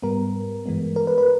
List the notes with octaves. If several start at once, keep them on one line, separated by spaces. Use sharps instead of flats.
G#2 G3 B3 A#4
G2 E3 G#3 B3
A#4
B4
B4